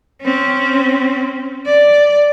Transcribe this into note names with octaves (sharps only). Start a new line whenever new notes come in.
C4 C#4
D5